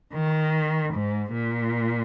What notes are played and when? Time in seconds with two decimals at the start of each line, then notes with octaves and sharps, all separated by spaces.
0.13 D#3
0.94 G#2
1.33 A#2